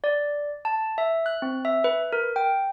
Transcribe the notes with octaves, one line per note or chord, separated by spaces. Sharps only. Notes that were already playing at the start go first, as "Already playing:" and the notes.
D5
A5
E5
F#6
C4
E5
B4
A#4
G5